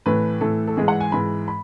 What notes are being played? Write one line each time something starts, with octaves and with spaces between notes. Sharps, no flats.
A2 E3 A3 B4
A2 E3 A3 A4
A4
G#2 E3 G#3 G#4
F#5
G#5
G#2 E3 G#3 B5
B5